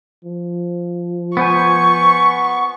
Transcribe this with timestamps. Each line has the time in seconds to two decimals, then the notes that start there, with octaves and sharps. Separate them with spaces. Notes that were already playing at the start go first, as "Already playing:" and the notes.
0.25 F3
1.37 B3 C5 G#5 C#6